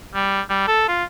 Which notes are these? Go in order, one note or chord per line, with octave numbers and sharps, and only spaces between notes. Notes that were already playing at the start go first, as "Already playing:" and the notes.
G3
G3
A4
F4